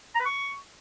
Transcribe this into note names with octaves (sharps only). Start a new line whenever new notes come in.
A#5
B4
C#6